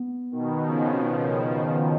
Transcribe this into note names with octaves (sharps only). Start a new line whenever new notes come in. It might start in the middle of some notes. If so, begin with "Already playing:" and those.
Already playing: B3
B2 D#3
C#3 F3
C#4
C#3 F3 B3